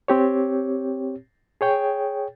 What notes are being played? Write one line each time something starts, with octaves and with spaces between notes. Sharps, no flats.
C4 G4 C#5
G#4 C#5 G5